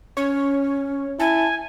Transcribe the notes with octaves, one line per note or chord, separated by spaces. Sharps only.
C#4 C#5
E4 G#5 A5